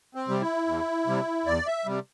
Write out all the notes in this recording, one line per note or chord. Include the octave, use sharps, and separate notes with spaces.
C4
C3 G3
E4
E2
C3 G3
E2 D5
E5
C3 G3